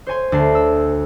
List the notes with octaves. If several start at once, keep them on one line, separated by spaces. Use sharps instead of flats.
C5 C#5 G#5 C6
D2 A5 C7
E6